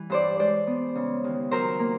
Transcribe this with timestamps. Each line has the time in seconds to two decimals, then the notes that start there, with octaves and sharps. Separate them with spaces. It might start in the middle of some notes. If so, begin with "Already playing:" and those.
Already playing: E3 G3
0.10 G2 C5 D5
0.39 G#3 C5 D5
0.67 B3
0.95 C#3
1.24 D#2
1.51 F#3 A#4 C5
1.79 A#3